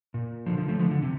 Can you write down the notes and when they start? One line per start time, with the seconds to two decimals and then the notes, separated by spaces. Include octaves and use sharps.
0.14 A#2
0.46 D3 F3
0.58 D3 F3
0.68 F3 A3
0.79 D3 F3
0.91 D3
1.02 C3